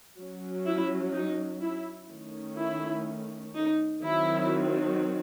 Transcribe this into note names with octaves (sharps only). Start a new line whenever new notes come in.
F#3 C#4
E4
D#4
E4
D#3 A3 C#4
E4
D#4
D#3 F#3 C4 E4